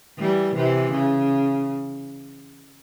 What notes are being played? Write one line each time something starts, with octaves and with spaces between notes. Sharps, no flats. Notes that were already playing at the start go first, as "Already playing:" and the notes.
E3 G3
C3 E3
C#3